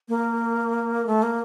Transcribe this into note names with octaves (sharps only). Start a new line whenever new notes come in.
A#3
A3
A#3